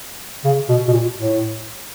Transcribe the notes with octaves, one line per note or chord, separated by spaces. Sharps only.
C#3
B2
B2
A#2
A2